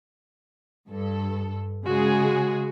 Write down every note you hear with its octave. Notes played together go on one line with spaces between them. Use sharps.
G2 A4
C#3 G#3 F#4 G#4